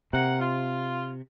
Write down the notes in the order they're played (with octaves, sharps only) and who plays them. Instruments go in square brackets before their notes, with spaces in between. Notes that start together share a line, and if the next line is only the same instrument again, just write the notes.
[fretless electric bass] C3 [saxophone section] A#3 F#5
[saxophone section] F4